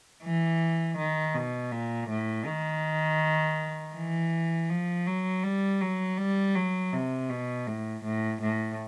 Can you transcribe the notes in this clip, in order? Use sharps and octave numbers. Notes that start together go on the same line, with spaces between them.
E3
D#3
B2
A#2
A2
D#3
E3
F3
F#3
G3
F#3
G3
F#3
C3
B2
A2
A2
A2